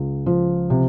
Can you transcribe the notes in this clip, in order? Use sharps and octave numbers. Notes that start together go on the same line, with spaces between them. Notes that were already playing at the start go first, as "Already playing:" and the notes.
Already playing: C#2
F3
C3